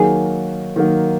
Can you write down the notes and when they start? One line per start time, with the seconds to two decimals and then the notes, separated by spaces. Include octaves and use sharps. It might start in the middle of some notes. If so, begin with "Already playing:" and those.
Already playing: D#3 F#3 A#3 G#4
0.76 D#3 F#3 A#3